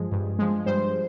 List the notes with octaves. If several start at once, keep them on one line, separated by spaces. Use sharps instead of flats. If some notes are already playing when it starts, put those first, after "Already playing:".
Already playing: G2 F3 G#3 G#4
G2
F3 G#3
G2 C5